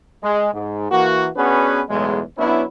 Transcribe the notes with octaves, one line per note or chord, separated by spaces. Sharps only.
G#3
G#2
E3 A#3 F#4
B3 C#4 D4 F#4 G#4 B4
B1 E2 A2 G#3
F#3 B3 C#4 D4 E4